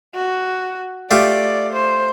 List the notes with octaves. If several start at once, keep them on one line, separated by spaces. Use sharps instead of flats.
F#4
A3 F4 G4 D5
C5